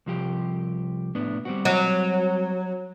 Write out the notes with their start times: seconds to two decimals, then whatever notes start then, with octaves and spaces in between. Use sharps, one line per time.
0.06 C2 F3 G4
1.15 A2 B3 D4
1.45 G3 C4 F#4
1.65 F#3